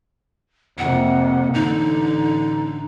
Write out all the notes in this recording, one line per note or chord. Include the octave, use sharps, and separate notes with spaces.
F2 C3 A#3 F#5
A1 D3 D#4